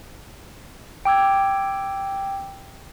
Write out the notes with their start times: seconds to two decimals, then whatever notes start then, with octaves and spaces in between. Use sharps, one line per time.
1.05 G5 D6 E6 G#6